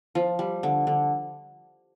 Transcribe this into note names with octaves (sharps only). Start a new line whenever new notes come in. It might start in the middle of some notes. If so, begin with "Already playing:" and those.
F3
G3
D3
D3